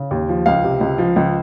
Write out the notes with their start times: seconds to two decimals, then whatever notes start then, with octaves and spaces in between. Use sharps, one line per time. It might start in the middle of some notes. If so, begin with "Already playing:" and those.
Already playing: C#3
0.11 D#2
0.29 F3
0.46 C#2 F5
0.64 C3
0.81 C#2
0.98 F3
1.16 C#2